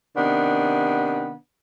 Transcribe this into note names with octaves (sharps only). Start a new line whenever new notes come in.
C3 D#3 B3 D4